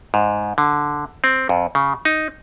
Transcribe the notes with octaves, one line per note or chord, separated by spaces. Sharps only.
G#2
D3
C4
F2
C#3
D#4